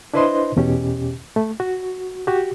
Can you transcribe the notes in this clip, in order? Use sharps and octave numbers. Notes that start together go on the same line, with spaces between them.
D4 E4 B4 C5 D#5 C6
E2 B2 C#4 G4
A3
F#4
F#4 G4